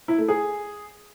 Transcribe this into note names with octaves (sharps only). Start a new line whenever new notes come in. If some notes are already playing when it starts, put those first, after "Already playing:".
E4
A3
G#4